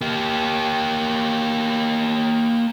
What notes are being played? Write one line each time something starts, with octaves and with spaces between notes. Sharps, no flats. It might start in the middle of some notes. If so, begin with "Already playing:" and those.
A#3 G4